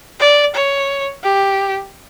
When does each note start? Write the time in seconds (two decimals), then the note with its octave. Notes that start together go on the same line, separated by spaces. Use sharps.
0.20 D5
0.55 C#5
1.23 G4